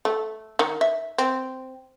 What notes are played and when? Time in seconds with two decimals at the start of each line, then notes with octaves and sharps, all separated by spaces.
0.05 A3
0.59 D#3
0.81 E5
1.18 C4